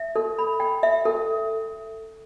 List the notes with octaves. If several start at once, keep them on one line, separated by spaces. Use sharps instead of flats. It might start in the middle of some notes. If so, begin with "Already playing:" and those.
Already playing: E5
A4
B5
G5
E5
A4